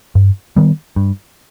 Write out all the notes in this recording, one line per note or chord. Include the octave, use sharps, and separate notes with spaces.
G2
D#3 G3 B3
G2